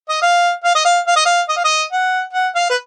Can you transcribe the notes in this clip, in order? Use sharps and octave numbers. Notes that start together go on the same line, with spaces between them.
D#5
F5
F5
D#5
F5
F5
D#5
F5
D#5
F5
D#5
F#5
F#5
F5
B4